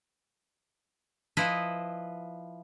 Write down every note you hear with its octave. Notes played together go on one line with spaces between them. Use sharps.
F3 E4 B4 D#5